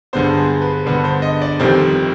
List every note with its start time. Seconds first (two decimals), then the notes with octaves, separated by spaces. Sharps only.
0.13 G2 D3 G#3 B3 C5
0.37 G#4
0.62 B4
0.86 G2 D3 G#3 B3 B4
1.04 C5
1.22 D#5
1.42 D5
1.60 F1 F2 D#3 G3 C5